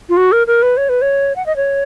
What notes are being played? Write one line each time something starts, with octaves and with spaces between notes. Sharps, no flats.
F4
F#4
A#4
A#4
B4
C#5
B4
C#5
F#5
D#5
C#5